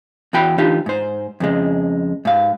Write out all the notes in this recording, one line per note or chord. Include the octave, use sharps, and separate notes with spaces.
E2 E3 F#4 G5 B5
E3 D4 D#4 F4 G4
G#2 C5
F2 C#3 G#3
G#2 F5